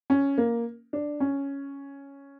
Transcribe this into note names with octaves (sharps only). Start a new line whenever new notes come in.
C#4
A#3
D4
C#4